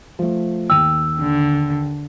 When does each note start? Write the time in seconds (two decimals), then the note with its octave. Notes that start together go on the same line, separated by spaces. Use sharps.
0.19 F3 A3
0.70 D#2 G5 E6
1.19 D3